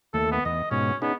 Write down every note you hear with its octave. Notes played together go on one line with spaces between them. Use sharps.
D#2 A3 A4
B3
E2 D#5
G#2 B2 C#4
B3 C#4 D#4 G#4